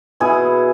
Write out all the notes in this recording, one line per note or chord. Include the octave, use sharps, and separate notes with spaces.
B2 E4 G#4